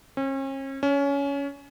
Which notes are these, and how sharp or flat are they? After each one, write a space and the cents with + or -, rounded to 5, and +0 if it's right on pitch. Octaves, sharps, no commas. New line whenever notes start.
C#4 -40
C#4 +20